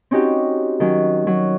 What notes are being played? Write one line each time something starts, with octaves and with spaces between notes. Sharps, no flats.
C4 C#4 D#4 F#4 G4
D#3 F#3 C#4
F#3